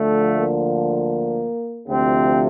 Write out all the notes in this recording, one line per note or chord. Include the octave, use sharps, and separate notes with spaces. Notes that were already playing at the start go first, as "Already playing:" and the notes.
Already playing: D2 D3 F3 A3
A#3
D2 C3 F3 C4